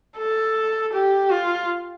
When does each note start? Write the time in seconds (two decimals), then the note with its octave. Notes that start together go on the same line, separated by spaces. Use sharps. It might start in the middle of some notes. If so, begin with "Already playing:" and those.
0.17 A4
0.93 G4
1.30 F4